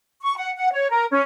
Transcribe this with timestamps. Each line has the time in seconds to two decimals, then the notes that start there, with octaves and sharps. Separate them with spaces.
0.22 C#6
0.36 F#5
0.56 F#5
0.72 C#5
0.90 A#4
1.10 C#4